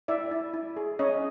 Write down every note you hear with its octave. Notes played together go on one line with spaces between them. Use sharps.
E4 D5 E5
E4
E4
G#4
C#4 C#5 D#5